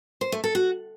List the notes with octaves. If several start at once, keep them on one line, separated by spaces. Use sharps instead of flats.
C5
A3
A4
F#4